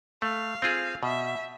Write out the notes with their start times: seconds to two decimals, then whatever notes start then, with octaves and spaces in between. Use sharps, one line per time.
0.22 A3 F5
0.62 C4 F4 G#4
1.03 B2 E5